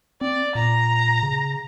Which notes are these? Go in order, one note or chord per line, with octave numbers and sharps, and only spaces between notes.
C4 D5
A#2 A#5
C#3